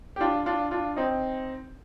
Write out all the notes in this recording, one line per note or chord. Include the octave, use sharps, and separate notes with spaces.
G4
D4 F4
D4 F4
D4 F4
C4 D#4